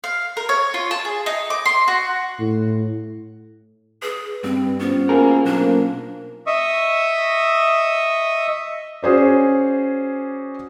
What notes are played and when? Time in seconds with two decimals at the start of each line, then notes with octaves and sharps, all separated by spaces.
0.04 F5
0.37 A#4
0.49 C#5
0.74 F4
0.91 A5
1.05 G#4
1.26 D#4
1.50 D6
1.65 C6
1.88 F#4
2.39 A2
4.02 G#4 B4
4.44 G2 C4
4.79 B3 C#4 F4 C5
5.09 A#3 G#4 A#4
5.45 B1 A#3 D4
6.47 D#5 E5 C#6 D#6 E6
9.03 C#4 F#4 G#4 C5 D5